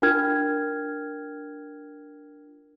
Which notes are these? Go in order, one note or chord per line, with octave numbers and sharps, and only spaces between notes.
D4 F4 A#4 G5 F6 G#6